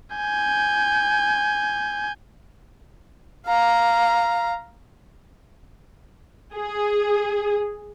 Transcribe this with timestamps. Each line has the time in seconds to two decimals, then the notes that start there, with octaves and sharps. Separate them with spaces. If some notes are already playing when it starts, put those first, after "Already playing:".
0.16 G#5 G6
3.46 F5 A#5
6.54 G#4